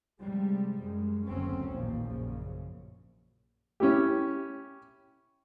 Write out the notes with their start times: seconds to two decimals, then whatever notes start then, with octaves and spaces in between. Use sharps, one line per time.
0.21 C3 F3 G3 G#3
0.81 F#2 G#3
1.26 F#1 D2 F#3 C4 C#4
1.70 A1 D#2 A#2 F3
2.07 A#1 F#2 C#3
3.80 C#4 E4 G4